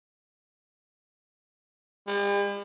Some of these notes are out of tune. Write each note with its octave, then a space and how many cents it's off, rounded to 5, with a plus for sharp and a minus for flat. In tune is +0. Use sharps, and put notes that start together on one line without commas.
G3 +45